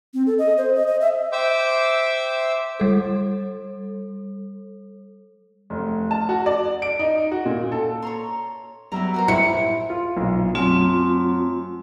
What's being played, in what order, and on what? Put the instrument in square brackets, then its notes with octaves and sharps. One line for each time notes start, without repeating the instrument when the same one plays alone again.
[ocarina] C4
A4
D#5
C5
D#5
D#5
E5
[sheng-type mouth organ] C5 E5 G5 D6 E6
[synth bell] G3 A4
[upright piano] F1
A5
F#4
D5
D7
D#4
F#4
A#2
A4
[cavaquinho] C#5 A#5 C6
[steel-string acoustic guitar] F#3 G3 B3 [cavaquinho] E4 E5 A#5
[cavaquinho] F#4 A#4 C5
[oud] E4 [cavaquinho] G4 C5 [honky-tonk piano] C#7
[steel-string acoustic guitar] G#5
[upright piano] F4
B1 A#2
[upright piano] F#2 [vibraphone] A3 C4 F4